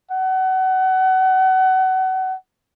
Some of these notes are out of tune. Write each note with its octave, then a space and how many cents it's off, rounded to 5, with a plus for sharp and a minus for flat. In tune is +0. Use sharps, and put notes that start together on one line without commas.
F#5 +25